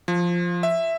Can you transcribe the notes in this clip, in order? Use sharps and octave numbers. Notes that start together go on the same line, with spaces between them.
F3
E5